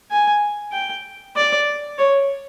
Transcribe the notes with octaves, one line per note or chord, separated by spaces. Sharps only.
G#5
G5
D5
C#5